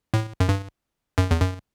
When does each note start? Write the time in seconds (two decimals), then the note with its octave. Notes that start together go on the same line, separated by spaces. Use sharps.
0.14 A2
0.40 F#2
0.49 G2
1.18 F#2
1.31 E2
1.40 F#2